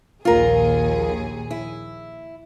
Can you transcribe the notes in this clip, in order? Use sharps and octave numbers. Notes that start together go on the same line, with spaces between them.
A#1 D#2 F4 G#4 A#4
E4